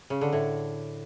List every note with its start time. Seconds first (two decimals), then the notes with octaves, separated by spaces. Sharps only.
0.10 C#3
0.21 D3
0.32 A2